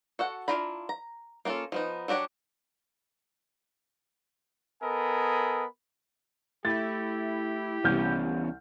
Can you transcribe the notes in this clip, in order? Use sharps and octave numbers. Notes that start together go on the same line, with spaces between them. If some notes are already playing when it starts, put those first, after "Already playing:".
F#4 A4 F#5
D4 E4 F4 A#5 B5
A#5
A#3 B3 C#4 F4 A4
F3 B3 D#4
F#3 D4 F#4 G4 C#5
B3 A4 A#4 D#5 G#5 B5
A3 E4 G4 A6
C2 E3 B3 C#4 F6 G6